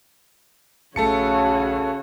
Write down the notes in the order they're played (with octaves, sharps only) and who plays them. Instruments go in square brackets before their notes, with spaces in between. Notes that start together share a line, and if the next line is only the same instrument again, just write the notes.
[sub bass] A#1 [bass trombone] C#3 [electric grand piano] A3 A5 C#7 [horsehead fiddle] F#4 C#5